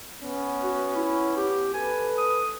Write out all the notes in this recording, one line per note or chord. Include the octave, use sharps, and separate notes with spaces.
B3 C#4
F#4
E4
G4
A4 B4 G#5
D#6